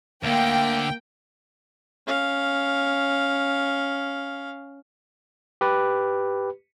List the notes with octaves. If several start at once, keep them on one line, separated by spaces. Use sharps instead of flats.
D2 D3 A#3 G5
C#4 F5
G4 B4